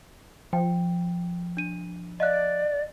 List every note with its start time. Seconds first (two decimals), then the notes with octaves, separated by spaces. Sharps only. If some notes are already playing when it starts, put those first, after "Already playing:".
0.53 F3 G5
1.57 D4 D#7
2.20 D5 D#5 F5 F#6